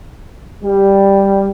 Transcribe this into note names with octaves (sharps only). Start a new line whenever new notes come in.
G3